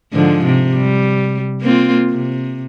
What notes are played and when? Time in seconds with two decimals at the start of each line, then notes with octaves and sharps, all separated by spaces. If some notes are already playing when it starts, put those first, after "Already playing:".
0.12 G#2 D3 F3
0.45 C3
0.75 G3
1.62 A#3 C4 F4
2.10 C3